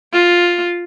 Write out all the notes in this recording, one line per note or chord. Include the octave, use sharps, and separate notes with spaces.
F4